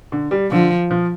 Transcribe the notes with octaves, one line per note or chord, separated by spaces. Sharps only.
D3
G3
D3 F3
F3